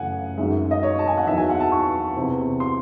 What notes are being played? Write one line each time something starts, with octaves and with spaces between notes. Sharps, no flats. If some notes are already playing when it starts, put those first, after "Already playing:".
Already playing: F#2 C#3 E3 A3 C#4 F#5 G#5
F#2 D#3 G#3 E5
D#5
C#5
A5
G#5
F#5
E2 D#3 F#3 E5
G#5
F#5
A5
C#6
E2 C3 E3 C4
C6